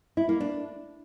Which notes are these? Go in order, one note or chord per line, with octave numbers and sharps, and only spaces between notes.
E4
A#3
D4